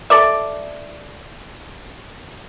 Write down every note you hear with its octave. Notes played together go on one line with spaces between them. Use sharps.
A4 D5 E5